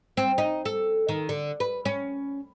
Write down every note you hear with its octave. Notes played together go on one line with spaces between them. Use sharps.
C4
D#4
A4
D#3
D3
B4
C#4